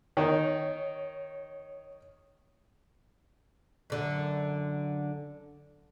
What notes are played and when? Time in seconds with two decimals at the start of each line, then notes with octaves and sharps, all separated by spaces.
0.17 D#3 D#4 C#5
3.90 F#2 D3